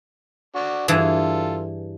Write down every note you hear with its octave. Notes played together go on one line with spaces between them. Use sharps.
D4 F#4
G2 E3 F4 G#4 A4